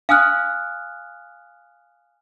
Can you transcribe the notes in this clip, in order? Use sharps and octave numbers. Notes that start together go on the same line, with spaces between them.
F5 G#5 D#6 F6 F#6